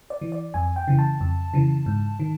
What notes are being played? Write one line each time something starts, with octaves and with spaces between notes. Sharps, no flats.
D5
E3
D5
F2 G#5
G5
C#3 E3
A5
F2
C#3 E3
G#2
D#3